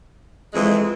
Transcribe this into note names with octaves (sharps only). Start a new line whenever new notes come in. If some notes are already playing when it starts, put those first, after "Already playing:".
F2 E3 G#3